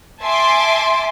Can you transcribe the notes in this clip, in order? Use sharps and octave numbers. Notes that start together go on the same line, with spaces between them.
E5 G#5 A5 C6 D6